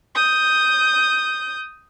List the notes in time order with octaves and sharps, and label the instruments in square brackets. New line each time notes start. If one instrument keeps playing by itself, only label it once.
[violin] D#6 G6